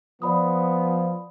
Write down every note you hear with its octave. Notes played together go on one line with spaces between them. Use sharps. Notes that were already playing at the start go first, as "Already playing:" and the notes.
F3 B3 D5 B5 D#6